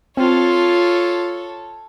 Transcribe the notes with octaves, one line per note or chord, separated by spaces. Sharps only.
C4 F4 A4 C#5